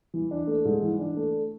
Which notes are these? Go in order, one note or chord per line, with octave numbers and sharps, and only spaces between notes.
E3
D4
A3
G#2
E3
D4
A3